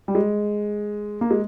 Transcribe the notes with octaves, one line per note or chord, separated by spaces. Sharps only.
G3
G#3
A#3
G#3